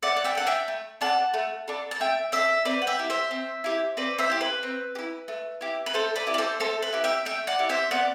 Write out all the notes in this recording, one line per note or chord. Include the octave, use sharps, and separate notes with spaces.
A3 D5 F#5
F#5
E5 G5
D4 A4 F#5
E5 G5
A3
D4 A4 F#5 A5
A3
D4 A4
A5
A3 E5 G5
D4 A4 C5 E5
C4 B4 D5
F#5
E5 G5
E4 G4
C5 E5
C4
E4 G4
C4 B4 D5
C5 E5
E4 G4
B4
C4
G4
E4
A3
E4 G4
B4
A3 A4 C5
B4 D5
E4 G4
D5
A4 C5
A3 A4 C5
B4
E4 G4
E5 G5
A3 E5 G5
D5 F#5
E4 G4
C5 E5
B3 D5 F#5